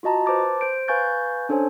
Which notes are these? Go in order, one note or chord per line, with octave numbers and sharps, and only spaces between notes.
F4 F#4 D#5 A5 A#5
B4 C5 A5 D6 A6
C5 G6 D7
B4 F5 G#5 C#6 G6 A6
C#4 D4 A4 C5 C#5 G#5